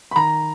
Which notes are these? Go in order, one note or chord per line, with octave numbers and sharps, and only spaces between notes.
B5
D#3 A#5